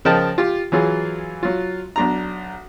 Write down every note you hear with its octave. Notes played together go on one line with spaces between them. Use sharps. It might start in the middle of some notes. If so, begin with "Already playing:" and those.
C#3 F3 A#4 D#5 G5 A5
F4 G4
E3 F#3 F4 G#4
F#3 F4
B1 D4 A#5